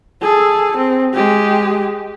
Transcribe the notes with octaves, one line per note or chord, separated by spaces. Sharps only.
G#4 A4
C4
G#3 G4